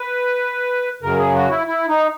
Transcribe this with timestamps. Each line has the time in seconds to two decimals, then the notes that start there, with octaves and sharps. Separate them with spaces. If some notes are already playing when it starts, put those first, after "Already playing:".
Already playing: B4
1.02 F#2 C#3 F#3 A#4
1.18 G#4
1.35 F#4
1.50 E4
1.67 E4
1.88 D#4